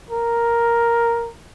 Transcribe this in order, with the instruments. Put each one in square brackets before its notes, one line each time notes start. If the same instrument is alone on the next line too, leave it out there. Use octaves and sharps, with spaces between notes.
[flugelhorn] A#4